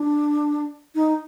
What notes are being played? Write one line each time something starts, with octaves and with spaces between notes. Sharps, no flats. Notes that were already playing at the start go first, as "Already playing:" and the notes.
Already playing: D4
D#4